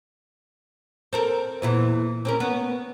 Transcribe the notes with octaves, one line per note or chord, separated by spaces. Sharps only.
C4 A4 A#4
E2 A#2 E3
C4 C#4 A#4
B3 C#4